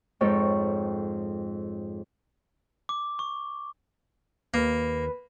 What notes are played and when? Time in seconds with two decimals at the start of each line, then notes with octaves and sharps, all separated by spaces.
0.21 F2 G#2 A4 C#5 G5
2.89 D6
3.19 C#6
4.54 D#2 A#3 B4